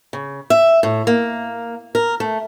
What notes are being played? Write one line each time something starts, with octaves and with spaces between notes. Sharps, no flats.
C#3
E5
A2
A#3
A#4
A3